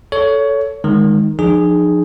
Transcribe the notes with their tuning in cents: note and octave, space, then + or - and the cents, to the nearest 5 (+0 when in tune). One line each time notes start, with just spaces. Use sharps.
A4 +0 C#5 +20
D#3 +0 G#3 +0
F3 +0 D#4 -40 G#4 +0